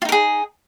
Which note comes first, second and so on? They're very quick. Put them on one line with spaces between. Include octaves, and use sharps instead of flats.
F4 D#4 A#4 G#4